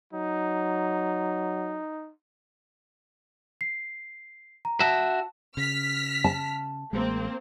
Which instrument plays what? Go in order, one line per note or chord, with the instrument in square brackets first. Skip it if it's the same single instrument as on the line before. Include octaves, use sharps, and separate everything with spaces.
[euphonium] F#3 [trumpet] D#4
[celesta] C7
A#5
[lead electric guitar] F#4 E5 [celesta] A5
[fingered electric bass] C#3 [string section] F6 B6
[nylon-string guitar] A5
[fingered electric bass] A1 G#3 [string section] A#3 C4